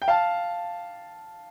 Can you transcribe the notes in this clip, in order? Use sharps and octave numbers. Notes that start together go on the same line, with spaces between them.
G5
F5 A5